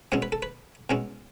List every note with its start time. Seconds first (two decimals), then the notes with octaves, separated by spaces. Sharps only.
0.12 B2 G#3 C#4 E4 C#5
0.22 B4
0.32 A4
0.42 B4
0.90 B2 G#3 C#4 E4